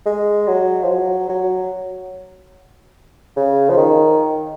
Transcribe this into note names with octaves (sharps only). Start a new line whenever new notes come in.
G#3
F#3
F3
F#3
F#3
C#3
F3
D#3